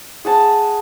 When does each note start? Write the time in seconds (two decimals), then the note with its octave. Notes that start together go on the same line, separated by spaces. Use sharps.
0.25 G#4 F#5 A5